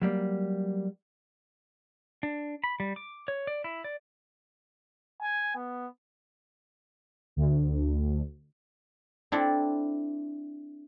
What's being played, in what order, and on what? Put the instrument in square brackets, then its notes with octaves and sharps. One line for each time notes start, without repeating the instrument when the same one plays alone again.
[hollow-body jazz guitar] F#3 G3 A#3
[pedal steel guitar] D4
B5
G3
D6
C#5
D5
E4
D5
[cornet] G#5
B3
[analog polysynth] D2
[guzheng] C4 D4 E4 A4 D5